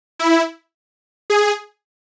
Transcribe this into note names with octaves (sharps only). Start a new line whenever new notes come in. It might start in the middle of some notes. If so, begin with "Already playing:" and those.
E4
G#4